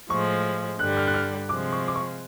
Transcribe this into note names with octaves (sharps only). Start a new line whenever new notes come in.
A2 F3 G#3 C#6
G2 D3 G3 F#6
F6
F#6
F6
C3 F3 G#3 D6
C#6
D6
C#6